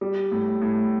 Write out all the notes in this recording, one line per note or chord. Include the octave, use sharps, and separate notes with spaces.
G3
A2
A2